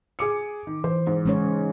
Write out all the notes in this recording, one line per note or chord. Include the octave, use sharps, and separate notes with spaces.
G#4 D6 C#7
D#3
E3 C5
G#2
G#3 C#4 C#5